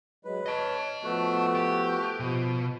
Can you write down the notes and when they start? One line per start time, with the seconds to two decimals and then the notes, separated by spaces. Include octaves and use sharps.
0.25 F#3 G#3 B4
0.46 C#5 D#5 A5
1.03 F3 A3 B3 F#4
1.54 G4
2.20 B2 F3